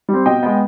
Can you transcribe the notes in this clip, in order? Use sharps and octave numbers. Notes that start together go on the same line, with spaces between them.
G3 C4
B2 D#5 G5
G#3 B3